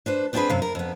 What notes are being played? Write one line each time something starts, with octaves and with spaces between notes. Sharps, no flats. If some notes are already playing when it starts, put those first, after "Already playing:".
D4 B4 C5
B3 C4 D4 E4 G#4 B4
F#2 C3 F5
A#4
F2 B3